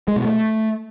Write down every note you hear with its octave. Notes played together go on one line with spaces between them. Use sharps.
G#3
B2
A3